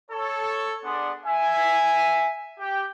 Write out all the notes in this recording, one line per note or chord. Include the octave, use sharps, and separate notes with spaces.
A4 C#5
B3 D4 G#4 D5 F#5 C6
E5 G#5
G4 G5